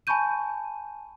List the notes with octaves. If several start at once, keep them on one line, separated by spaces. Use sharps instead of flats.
G#5 A5 B5 C#6 G6 D#7